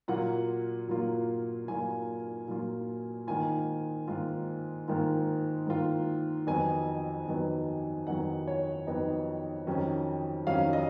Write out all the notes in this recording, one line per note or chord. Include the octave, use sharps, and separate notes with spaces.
A#2 F#3 A#3 F4 F#5
A#2 F#3 A#3 F4
A#2 F#3 A#3 F4 G#5
A#2 F#3 A#3 F4
G#2 D#3 A#3 F4 G#5
G#2 D#3 A#3 F4
G#2 D#3 A#3 F4
G#2 D#3 A#3 F4
F2 D#3 F#3 B3 D#4 G#5
F2 D#3 F#3 B3 D#4
F2 D#3 F#3 B3 D#4 F#5
C#5
F2 D#3 F#3 B3 D#4
F2 D#3 F#3 C#4
F2 D#3 F#3 C#4 F5
D#5